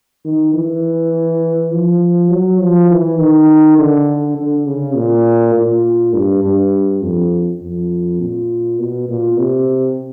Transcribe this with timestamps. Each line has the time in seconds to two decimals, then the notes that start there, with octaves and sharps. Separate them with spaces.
0.25 D#3
0.54 E3
1.72 F3
2.31 F#3
2.61 F3
2.90 E3
3.20 D#3
3.78 D3
4.37 D3
4.67 C#3
4.96 A#2
5.55 A#2
6.14 G2
6.43 G2
7.02 F2
7.61 F2
8.21 A#2
8.79 B2
9.08 A#2
9.38 C3